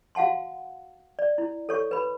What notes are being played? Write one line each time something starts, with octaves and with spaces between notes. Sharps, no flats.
F#4 F5 F#5 A5 C6
D5
E4
A4 C#5 C#6
B4 B5